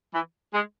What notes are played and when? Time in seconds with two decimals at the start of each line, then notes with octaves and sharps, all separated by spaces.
0.13 E3
0.53 G#3